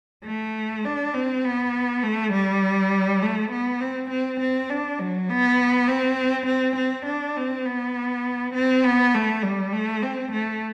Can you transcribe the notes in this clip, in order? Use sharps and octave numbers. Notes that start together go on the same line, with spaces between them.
A3
D4
C4
B3
A3
G3
A3
B3
C4
C4
C4
D4
F#3
B3
C4
C4
C4
D4
C4
B3
C4
B3
A3
G3
A3
C4
A3